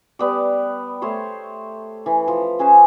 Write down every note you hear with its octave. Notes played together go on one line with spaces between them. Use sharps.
G3 B3 D5
A3 C5 C#5 C6
E3
F3
C#4 G#4 B4 C5